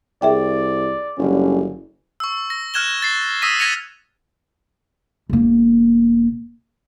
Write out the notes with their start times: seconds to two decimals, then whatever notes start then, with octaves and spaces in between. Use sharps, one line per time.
0.22 C2 G#4 D5 E5 G5
1.18 F#1 D3 G3 C#4
2.20 C#6 E6
2.50 A#6
2.74 F6 F#6 G#6 E7 G7
3.02 A6 C7
3.42 D#6 E6 A#6 B6 D#7
3.59 G#6 A#6 B6 C#7 D#7 F7
5.29 E1 A#3